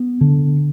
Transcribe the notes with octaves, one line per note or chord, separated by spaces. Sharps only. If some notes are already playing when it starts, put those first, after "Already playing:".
Already playing: B3
D3